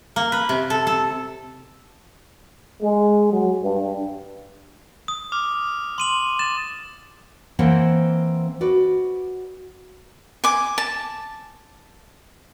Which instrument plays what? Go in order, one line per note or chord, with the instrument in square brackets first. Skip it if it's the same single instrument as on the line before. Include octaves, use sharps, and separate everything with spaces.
[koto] A#3
B4
C3
A4
A4
[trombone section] G#3
F#3
G2
[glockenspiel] D#6
[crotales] D6 F6
[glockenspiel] C6 D#7 F#7
[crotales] A6 [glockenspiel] E7
[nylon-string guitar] E3 A#3 C4 C5 F#5
F#4 B4 D5
[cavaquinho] G#5 D6
A5